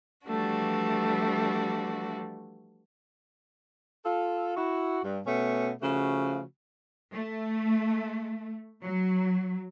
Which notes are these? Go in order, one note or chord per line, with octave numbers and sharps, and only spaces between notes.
E3 F3 G3 A3 D4 F#4
F4 A4
E4 F#4
G2
B2 A3 B3 C#4 C#5
C#3 F3 A3 F#4
A3
F#3